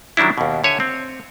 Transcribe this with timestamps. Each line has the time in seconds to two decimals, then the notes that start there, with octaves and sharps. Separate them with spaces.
0.17 D#3 F#3 G3 D4 E4
0.38 D#2 B2
0.64 D3 C#5 E5 G#5
0.80 C4